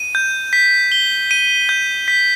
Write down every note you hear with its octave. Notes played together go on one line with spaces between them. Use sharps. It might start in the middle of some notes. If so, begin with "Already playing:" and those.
Already playing: D#7
G6
B6
G7
D#7
G6
B6